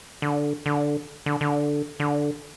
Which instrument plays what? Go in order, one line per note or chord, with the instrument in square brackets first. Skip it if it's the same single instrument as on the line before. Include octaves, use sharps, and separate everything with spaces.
[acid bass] D3
D3
D3
D3
D3